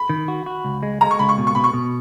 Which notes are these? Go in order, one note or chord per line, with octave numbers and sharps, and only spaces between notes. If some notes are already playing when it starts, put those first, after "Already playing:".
Already playing: B5
D#3
F#4
F#4
C#2
G#3
G#3 A#5
C#6
C#2 B5
C#6
B2
C#6
B2 B5
C#6
B2